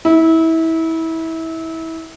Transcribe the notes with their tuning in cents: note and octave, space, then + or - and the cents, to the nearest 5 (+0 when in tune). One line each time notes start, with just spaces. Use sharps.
E4 -25